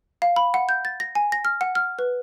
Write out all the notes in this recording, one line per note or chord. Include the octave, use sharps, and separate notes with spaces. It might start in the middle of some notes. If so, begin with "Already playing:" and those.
F5
B5
F#5
G6
A6
A#6
G#5
A#6
F6
F#5
F6
B4